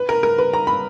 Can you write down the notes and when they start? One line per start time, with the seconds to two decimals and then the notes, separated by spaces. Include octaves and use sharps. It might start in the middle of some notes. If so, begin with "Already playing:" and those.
Already playing: B4
0.09 A#4
0.23 A#4
0.38 B4
0.53 A#5
0.67 B5